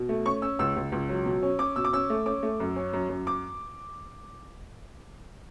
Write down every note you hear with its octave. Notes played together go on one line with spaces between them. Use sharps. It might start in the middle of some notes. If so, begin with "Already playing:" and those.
Already playing: B2
A3
C#4 C#6
C#4 E6
C#2 E6
C#2
C#2
F#3
B2
C#4
C#4 D6
B2 E6
D6
C#4 E6
A3
C#4 D6
A3
F#2
C#4
F#2
F#2
D6